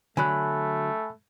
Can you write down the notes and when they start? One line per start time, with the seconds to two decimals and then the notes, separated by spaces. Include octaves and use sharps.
0.17 D3 F#3 A3 G#5 B5 F#6